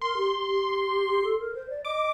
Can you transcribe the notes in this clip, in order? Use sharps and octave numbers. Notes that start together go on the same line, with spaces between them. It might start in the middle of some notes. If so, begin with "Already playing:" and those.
A#4 C6
G4
G4
A4
A#4
C5
D5
D#5 D6